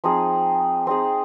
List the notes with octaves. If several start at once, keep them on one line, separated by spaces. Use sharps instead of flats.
F3 C4 D#4 G#4
C4 D#4 G#4